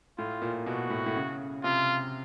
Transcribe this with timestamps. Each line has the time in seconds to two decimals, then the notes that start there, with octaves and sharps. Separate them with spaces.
0.18 A2 F4
0.42 A#2
0.66 B2 F#4
0.90 A2
1.06 A2
1.15 C#3
1.63 C3 F4